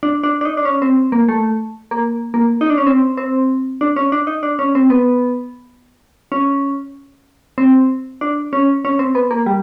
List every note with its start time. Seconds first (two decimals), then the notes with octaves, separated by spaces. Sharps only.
0.03 D4
0.23 D4
0.41 D4
0.45 D#4
0.57 D4
0.65 C#4
0.82 C4
1.12 A#3
1.28 A3
1.91 A#3
2.34 A#3
2.61 D#4
2.70 D4
2.78 C#4
2.87 C4
3.17 C4
3.81 D4
3.96 C#4
4.12 D4
4.27 D#4
4.43 D4
4.59 C#4
4.75 C4
4.90 B3
6.32 C#4
7.58 C4
8.21 D4
8.53 C#4
8.85 C#4
8.99 C4
9.15 B3
9.31 A#3
9.46 G3